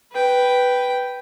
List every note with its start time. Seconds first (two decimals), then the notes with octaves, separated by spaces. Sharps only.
0.12 B4 G5